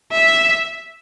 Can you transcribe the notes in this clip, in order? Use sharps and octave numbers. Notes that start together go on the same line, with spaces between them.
E5